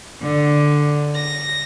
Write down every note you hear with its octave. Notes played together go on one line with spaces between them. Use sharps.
D3
A#6